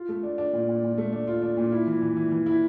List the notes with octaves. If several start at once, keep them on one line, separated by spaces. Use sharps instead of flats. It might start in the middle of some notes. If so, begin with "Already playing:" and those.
Already playing: F4
A3
D4
D4
A#2
A#2
A#2
A3
D4
F4
D4
A#2
E4
E3
E3
E3
E3
E4